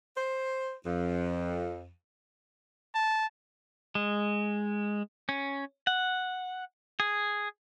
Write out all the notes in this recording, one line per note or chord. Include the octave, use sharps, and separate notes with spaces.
C5
F2
A5
G#3
C#4
F#5
G#4